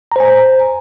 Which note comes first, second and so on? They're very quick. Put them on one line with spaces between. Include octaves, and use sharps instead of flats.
A#5 C5 G#5